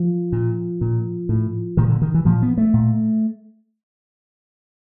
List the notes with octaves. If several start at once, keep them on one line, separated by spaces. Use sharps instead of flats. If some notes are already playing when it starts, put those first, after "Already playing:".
Already playing: F3
A#2
A#2
A2
A#2 D#3
D3
D#3
E3
A#2 F3
B3
A3
A#2